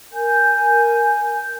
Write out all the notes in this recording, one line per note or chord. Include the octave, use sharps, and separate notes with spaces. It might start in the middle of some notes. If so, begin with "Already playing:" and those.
A#4 G#5 G6